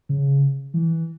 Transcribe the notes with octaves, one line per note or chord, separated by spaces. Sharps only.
C#3
E3